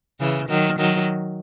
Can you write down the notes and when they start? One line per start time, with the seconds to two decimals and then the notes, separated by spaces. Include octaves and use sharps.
0.20 C#3 E3
0.49 D#3 F#3
0.79 D#3 F#3